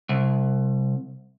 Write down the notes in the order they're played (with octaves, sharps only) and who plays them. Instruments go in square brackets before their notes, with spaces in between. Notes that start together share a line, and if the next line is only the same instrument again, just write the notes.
[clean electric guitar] C2